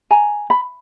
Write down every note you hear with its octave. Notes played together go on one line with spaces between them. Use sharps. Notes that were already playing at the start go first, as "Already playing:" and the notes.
G#5 A#5
B5